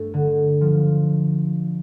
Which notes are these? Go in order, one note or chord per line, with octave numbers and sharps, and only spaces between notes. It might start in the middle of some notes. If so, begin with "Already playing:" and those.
Already playing: G2 A3
D3
F3